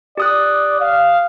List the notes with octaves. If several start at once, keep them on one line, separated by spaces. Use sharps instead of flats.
G4 D5 D#6 F#6
F5